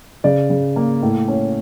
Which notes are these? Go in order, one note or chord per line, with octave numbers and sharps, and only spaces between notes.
C#3 D5
C#3
A#3
A2
C#4